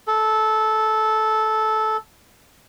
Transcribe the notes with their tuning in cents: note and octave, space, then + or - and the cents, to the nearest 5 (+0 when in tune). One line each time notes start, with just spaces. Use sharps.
A4 -15